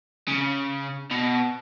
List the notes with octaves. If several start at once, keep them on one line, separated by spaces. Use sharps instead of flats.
C#3
B2